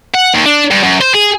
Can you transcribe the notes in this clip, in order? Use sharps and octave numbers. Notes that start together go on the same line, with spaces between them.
F#5
D#2
D4
G2
F#2
C5
G#4